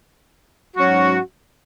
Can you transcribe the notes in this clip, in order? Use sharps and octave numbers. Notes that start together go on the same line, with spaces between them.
G#2 F#3 C#4 F#4